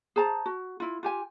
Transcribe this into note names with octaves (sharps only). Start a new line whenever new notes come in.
G#4 C5 A5 A#5
F#4
E4 F4
F4 G4 G#5